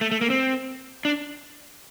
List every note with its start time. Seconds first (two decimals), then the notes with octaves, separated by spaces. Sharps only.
0.01 A3
0.12 A3
0.21 A#3
0.30 C4
1.05 D4